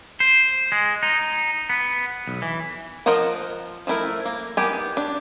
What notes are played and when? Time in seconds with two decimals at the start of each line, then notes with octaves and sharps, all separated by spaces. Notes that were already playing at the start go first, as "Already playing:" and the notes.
0.20 C5
0.72 G#3
1.03 D#4
1.69 B3
2.28 B1
2.42 E3
3.06 F3 A#4 C5 D#5 F#5
3.87 F3 A3 E4 A#4
4.25 A#3
4.57 D#3 B3 G4 G#5
4.97 D4